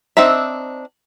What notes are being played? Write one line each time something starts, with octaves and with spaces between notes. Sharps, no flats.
C4 D4 D#4 E5